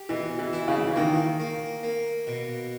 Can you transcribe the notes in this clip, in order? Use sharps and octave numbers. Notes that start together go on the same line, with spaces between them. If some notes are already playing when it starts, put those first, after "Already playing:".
Already playing: G4
B2 E3
E3
E4
C#3
E3
D#3 A#3
A#3
A#3
B2